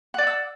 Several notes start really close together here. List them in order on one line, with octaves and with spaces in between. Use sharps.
F#5 D5 E5 E6